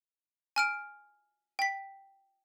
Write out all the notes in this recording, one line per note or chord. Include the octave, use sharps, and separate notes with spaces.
G#5 F6 D7
G5 B6